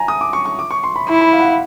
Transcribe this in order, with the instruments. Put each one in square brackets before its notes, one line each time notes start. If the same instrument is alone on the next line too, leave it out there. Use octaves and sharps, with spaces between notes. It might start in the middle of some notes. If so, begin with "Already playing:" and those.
Already playing: [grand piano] G#5 A#5
D#6
D6
C#6
C#6
D6
C#6
C6
B5
[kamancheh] E4 [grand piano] B5
[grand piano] B5
F5
F#5
F5